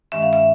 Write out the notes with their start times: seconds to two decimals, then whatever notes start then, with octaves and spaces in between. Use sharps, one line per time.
0.12 G2 D#3 G#3 C#4 E5
0.22 F5
0.33 E5